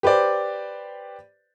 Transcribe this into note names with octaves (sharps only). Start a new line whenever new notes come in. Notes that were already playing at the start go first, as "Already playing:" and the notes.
G4 B4 C5 D5